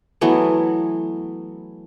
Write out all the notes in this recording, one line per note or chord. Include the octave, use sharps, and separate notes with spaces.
E3 F#3 A3 B3